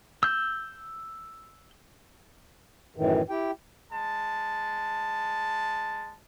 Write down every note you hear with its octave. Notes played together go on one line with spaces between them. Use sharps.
E6 G6
F#2 A2 D#3 E3
E4 G4 G5
G#3 A5